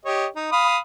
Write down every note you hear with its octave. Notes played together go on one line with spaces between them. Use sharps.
G4 C#5 D#5
D#4
F5 B5 D#6